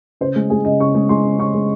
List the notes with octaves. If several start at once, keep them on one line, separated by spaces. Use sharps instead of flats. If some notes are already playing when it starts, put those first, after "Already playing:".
C#3 C5
G#3
G#3 G#4
C#3 D#5
C#3 C#6
G#3
G#3 C6
C#3
C#3 C#6
G#3